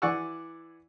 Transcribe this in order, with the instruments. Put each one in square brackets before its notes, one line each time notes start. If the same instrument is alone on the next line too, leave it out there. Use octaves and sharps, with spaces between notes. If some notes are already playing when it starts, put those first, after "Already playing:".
[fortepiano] E3 D5 F#5 G#5 C#6 E6